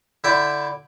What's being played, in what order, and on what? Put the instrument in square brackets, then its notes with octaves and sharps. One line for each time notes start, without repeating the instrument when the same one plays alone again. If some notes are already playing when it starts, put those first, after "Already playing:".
[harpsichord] D3 D4 E4 E5 G5 B5